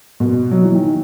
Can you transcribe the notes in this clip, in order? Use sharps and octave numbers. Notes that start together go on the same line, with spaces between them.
B2
F#3
E3
D#3